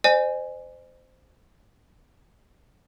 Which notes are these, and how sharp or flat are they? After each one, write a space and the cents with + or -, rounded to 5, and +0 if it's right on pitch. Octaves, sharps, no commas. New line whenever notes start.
C5 -15 D#5 -45 G#5 +0